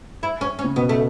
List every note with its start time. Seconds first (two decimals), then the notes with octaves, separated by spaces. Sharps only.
0.23 E4
0.41 C#4
0.59 C#4
0.64 C#3
0.76 B2 B3
0.89 A3